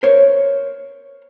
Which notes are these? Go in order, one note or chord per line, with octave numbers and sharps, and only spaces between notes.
A#4 C5 C#5